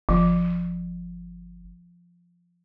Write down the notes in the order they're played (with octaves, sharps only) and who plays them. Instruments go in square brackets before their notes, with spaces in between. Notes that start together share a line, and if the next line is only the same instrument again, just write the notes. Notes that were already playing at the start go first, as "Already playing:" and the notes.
[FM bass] G1 [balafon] F3